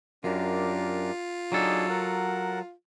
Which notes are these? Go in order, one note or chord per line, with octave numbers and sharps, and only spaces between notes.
F#2 D4 F4 G4 A#4
F#3 D4 D#4 G#4 A4
A#4 F#5